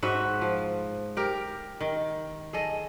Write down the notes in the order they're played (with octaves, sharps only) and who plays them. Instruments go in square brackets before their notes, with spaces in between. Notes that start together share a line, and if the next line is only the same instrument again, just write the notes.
[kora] G#2 F#4 B4 E5
F3
G4 A#4
D#3
G#4 A4 D#5